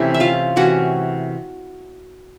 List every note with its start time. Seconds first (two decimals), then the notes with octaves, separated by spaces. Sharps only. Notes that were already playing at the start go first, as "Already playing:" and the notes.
Already playing: C3 E3 A3 C#4 E4
0.14 E5
0.20 F4 F5
0.56 C3 E3 A3 C#4 F#4 F#5